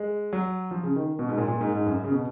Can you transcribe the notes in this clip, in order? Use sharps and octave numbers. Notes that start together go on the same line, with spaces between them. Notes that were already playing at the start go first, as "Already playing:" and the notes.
Already playing: G#3
F#3
F3
C#3
D#3
B2
G#2
A#2
A#2
G#2
G#2
F#2
C#3
B2